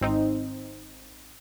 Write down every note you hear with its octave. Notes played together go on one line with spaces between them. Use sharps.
G#1 C4 D#4